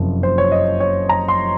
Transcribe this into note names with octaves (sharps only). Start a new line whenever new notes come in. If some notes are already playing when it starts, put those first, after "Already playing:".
Already playing: F#1 F2 C3 F3 A#3
C5
C#5
D#5
C#5
A#5
C6